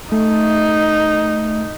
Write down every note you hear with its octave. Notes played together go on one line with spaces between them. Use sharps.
A3 D#4